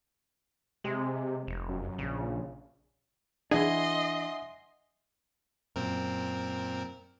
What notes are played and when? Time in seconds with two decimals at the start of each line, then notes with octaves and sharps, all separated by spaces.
0.84 C3 G#3
1.47 F1
1.68 F#2
1.98 A#1 C#3
3.51 E3 D4 G#4 D#5 E5 F#5 G#5 C6
5.76 F#2 A#2 C4 A#4